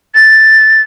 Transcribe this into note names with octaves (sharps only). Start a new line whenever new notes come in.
A6